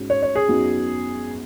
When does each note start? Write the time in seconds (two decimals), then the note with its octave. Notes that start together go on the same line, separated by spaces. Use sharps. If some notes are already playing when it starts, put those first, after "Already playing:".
Already playing: G#2 G#3 C#4 F#4
0.10 C#5
0.23 C#5
0.36 G#4
0.48 F#2 F#3 B3 D#4 F#4